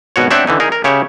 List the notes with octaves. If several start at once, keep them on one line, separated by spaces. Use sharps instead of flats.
G#1 B2 F#4 C#5
C4 D4 C#5 E5 F#5 G5
D3 E3 D#4
D#4 G#4 A#4
A#4
C#3 G4 C#5 E5